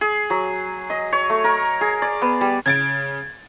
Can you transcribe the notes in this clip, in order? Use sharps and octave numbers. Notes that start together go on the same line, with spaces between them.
G#4
F#3
D#5
C#5
A3
A#4
G#4
D5
B3
G3
C#3 G#6 A6 D7